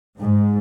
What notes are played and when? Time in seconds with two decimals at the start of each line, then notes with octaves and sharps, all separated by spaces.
0.18 G#2